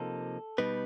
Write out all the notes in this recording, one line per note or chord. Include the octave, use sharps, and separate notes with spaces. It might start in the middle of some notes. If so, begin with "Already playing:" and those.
Already playing: C3 F3 A#3 D#4 A4
B2 G3 B3 D#4 B4